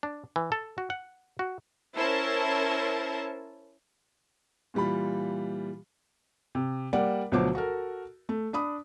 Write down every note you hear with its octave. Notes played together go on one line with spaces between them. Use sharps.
D4
E3
A4
F#4
F#5
F#4
C#4 E4 A#4 C5 A5
A#2 E3 G3 F4 B5
C3
G3 A#3 D5 F#5
D2 B2 F3 F#3 C5 D6
F#4 A4 A#4
A3
D4 B5 D#6